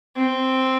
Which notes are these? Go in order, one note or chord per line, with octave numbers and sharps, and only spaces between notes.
C4